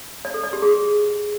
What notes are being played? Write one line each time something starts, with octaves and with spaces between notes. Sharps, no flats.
D5
A4
D5
G4
G#4